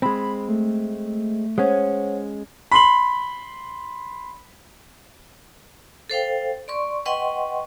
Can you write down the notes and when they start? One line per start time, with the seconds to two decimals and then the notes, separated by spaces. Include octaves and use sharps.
0.02 G#3 C4 B5
0.49 A3
1.58 G#3 C#4 C5 C#5 F#5
2.71 B5 C6 F#7
6.10 A4 C5 F5 G5
6.68 D5 C6 C#6
7.06 B4 D#5 F#5 G5 C6 C#6